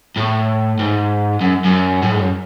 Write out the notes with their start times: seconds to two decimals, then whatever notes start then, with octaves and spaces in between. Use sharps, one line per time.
0.17 A2
0.79 G#2
1.41 F#2
1.65 F#2
2.03 A2
2.12 G#2
2.19 F#2